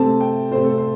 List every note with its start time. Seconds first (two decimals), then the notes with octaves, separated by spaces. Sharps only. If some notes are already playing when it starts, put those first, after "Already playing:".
Already playing: C3 A3 C4 A5
0.20 G5
0.51 C3 A3 C4 C5
0.64 A4
0.78 C5